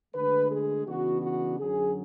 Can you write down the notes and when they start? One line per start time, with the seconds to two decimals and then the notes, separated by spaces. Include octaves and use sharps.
0.13 D2 D3 G#3 B4
0.50 G#4
0.86 C#3 E3 B3 D4 F#4
1.22 F#4
1.58 F#2 D3 F#3 G#4